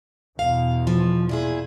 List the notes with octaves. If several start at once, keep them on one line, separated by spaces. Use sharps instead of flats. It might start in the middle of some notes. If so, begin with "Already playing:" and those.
E2 B2 F5
F3
A#2 E4 G#4